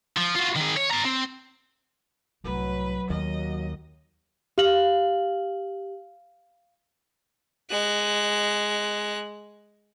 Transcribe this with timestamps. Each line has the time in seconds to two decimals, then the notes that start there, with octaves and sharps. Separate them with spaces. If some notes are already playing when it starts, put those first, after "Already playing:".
0.17 F3
0.36 F4 F#4
0.56 D#3 G#4
0.76 C#5
0.91 D5 A#5
1.05 C4
2.44 C2 A2 F#3 B4
3.10 D#2 A3 D#5
4.58 G4 F5 F#7
7.70 G#3 F#6